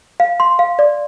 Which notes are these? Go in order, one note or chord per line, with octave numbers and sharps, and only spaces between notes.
F5
C6
F5
D5